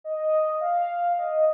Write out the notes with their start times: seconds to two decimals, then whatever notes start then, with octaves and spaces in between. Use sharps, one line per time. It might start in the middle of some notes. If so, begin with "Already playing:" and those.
0.04 D#5
0.61 F5
1.19 D#5